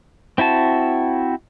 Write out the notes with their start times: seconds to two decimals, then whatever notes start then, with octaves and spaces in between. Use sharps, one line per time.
0.38 C4 E4 F#4 A5